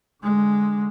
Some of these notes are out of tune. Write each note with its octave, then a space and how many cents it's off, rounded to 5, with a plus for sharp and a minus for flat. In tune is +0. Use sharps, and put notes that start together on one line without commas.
D3 +0 G#3 +0